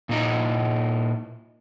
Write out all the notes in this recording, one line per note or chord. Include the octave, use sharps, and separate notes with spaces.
A#2 D#4 E4